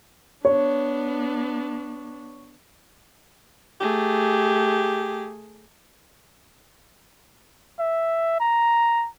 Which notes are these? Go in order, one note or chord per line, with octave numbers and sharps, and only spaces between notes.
B3 D4 C#5
A3 G4 G#4
E5
A#5